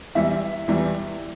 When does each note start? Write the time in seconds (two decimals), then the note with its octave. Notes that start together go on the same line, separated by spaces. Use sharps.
0.15 E2 E3 G3 E5
0.68 E2 E3 G3